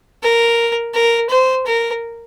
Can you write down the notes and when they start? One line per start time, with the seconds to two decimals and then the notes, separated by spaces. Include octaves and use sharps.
0.23 A#4
0.94 A#4
1.30 C5
1.66 A#4